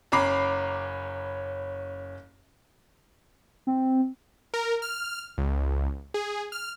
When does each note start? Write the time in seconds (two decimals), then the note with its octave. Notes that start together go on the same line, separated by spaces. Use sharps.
0.12 F#1 C#4 A#5 B5 D6 C7
3.67 C4
4.54 A#4
4.82 F6
5.38 C#2
6.14 G#4
6.52 F6